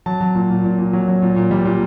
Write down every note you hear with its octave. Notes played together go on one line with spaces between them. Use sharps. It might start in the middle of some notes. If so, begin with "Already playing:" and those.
F#3 A5
F#3
A#2
A#2
A#2
A#2
F#3
F#3
A#2
A#2
G3
A#2